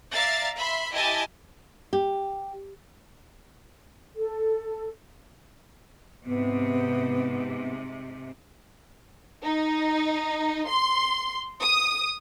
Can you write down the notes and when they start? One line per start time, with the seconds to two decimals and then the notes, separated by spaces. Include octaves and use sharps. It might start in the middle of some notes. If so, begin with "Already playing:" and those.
0.11 D5 E5 F5 A#5 A6 C7
0.56 E5 B5 C6
0.92 E4 G4 D#5 G#5 A5
1.93 G4
4.16 A4
6.25 G#2 C3 B3
9.44 D#4
10.68 C6
11.61 D#6